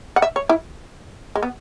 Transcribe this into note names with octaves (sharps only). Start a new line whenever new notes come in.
F#5
E5
C#5
E4
G#3
B3